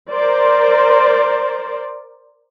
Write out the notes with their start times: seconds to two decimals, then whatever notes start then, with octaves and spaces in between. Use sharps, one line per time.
0.11 A#4 C5 D5